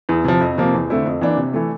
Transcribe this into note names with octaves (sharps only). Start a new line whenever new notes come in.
E2
C3 F3
F2
C3 F3 A#3
E2
D3 A3 C4 E4
F2
E3 A#3 D4
C3
E3 A3